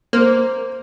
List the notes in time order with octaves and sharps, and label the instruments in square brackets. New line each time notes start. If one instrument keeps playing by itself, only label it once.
[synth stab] A#3 [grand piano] C5